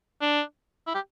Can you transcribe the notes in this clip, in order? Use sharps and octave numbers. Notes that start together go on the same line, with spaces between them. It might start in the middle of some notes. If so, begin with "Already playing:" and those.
D4
E4
G4